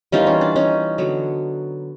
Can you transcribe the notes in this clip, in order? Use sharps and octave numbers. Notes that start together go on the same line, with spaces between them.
E3 G3 A#3 C#4 D#4 F4
C#4
D4
C#4 D#4
D3 F#3 B3